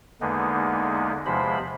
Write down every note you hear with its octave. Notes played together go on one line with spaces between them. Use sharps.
E2 D3 G#3 A#3 B3 D#4
E2 C3 F3 G#3 C5 B5